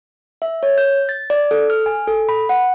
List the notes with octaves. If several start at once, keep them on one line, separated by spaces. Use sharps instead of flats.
E5
C#5
G6
A6
D5
A4
F6
G#5
A4
B5
F#5